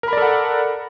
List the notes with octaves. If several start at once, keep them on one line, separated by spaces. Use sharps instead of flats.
A4 A#4 D5 F#5 B5